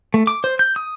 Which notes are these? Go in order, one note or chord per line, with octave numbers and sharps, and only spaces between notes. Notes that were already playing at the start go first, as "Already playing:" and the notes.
A3
D6
C5
G6
D#6